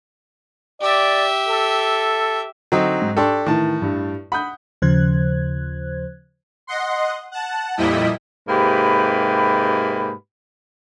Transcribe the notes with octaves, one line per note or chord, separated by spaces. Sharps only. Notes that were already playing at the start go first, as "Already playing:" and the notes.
G4 D5 E5
A4
D3 F#3 C4 D#4
G#2
D4 G4 A4 A5 C6 C#6
A2 D#3 E3 A5
G2
F#5 B5 D#6 G6
D#2 C#3 F3 C5 F#6 G#6
D#5 F#5 C6
F#5 A5
F2 A#2 G3 E4 D#5 B6
G#2 C3 A#3 G4 B4 B5